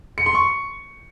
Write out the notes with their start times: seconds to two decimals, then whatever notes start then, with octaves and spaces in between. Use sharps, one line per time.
0.18 C#7
0.26 C6
0.35 C#6